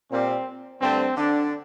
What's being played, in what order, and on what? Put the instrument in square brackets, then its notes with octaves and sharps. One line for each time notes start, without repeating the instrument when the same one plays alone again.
[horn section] A#2 G3 A#3 C4
G2 D3 A3 C4
D3 D4